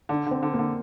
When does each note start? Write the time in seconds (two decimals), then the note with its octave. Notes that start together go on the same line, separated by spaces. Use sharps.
0.09 D3 D4
0.26 D3 C4
0.43 D3
0.53 A#3
0.59 D3